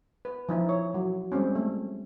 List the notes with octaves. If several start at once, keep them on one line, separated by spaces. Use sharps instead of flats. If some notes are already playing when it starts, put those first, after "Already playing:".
B4
F3 D#4 E4
C#5
F#3
G3 G#3 C4 C#4
A3